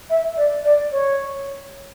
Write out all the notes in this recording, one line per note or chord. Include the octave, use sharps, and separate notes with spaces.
E5
D5
D5
C#5